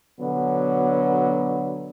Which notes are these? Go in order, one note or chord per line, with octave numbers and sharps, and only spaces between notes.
B2 D3 F#3 B3